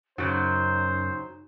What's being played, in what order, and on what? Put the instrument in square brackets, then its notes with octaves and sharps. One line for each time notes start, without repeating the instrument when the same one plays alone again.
[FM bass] F#2 [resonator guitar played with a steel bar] C#3 F#3 [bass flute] D#4 [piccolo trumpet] C5